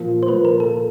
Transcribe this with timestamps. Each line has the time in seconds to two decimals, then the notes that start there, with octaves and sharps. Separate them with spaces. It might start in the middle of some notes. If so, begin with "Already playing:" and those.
Already playing: A#2 F3 A#3
0.23 C5
0.28 A#2 F3 A#3 B4
0.45 A#4
0.60 A4